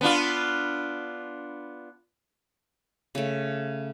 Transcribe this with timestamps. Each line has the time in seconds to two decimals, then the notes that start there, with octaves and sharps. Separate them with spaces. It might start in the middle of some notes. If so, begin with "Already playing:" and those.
0.01 B3 D4 F4
3.15 C#3 A3